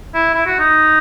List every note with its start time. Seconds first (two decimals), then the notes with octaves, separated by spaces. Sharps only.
0.14 E4
0.34 E4
0.46 F#4
0.59 D#4